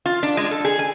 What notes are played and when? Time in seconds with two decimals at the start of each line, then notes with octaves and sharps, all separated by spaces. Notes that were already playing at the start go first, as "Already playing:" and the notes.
0.06 F4
0.23 D4
0.37 G#3
0.51 A4
0.65 G#4
0.79 G#5